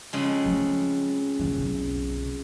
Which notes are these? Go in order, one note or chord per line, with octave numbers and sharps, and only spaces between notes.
F2 C#3 G#3
F3 A3
D#2 E3
F#1 B1